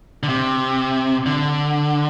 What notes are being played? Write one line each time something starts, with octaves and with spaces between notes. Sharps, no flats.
D3
C3
D3